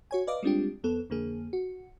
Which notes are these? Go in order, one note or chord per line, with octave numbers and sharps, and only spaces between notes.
F#4 C#5 G#5
B4 D5 D#5 F5 D6
G3 G#3 C4 D4 F4 G4
F2 B3 A4
F2 D3 A#3 G#4
F#4